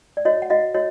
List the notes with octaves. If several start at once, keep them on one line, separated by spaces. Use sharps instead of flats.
D5
F#4 C#5 D#5
F#5
F#4 D#5 F5
F#4 C#5 D#5